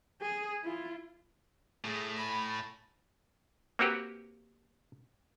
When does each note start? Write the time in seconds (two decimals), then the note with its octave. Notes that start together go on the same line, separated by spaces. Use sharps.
0.22 G#4
0.64 E4 F4
1.85 A2 G#4
2.16 G#5 B5
3.79 A#3 C4 F#4 G4 B4